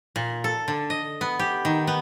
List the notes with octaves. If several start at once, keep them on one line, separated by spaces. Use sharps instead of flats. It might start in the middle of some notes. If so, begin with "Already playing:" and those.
A#2
A4
D3
D#5
B3
G4
D#3
B3